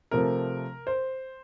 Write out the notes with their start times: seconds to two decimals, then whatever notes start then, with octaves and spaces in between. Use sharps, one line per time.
0.11 C3 F3 A3 A#4
0.87 C5